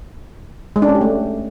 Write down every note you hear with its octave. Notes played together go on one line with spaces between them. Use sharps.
G#3
D4
C#4
G4
A3